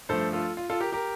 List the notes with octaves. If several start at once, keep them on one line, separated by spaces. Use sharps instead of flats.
G2 F3 A3 A4 C5
F4 A4
F4
F4 A4
G4 A#4
G4 A#4